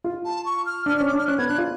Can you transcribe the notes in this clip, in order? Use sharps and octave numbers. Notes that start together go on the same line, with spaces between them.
F4
A5
C#6
F6
D4 F6
C#4 F6
D6
D4
F6
C#4 F#6
B3 G#6
D4 F#6
F4